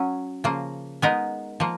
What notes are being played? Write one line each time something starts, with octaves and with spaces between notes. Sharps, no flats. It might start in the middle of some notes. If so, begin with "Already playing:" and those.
Already playing: F#3 C#4
C#3 F3 A#3
G#3 B3 D#4 A#4
F3 A#3